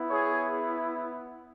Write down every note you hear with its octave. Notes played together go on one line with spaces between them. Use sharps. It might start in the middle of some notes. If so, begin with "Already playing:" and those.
Already playing: B3 E4
G#4 C#5